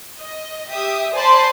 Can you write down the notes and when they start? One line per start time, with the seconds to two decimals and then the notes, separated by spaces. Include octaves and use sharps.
0.19 D#5
0.69 G4 E5 D#6
1.15 C5 D5 G#5 A5 B5 C6